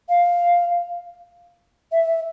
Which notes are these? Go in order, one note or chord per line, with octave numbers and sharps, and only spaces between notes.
F5
E5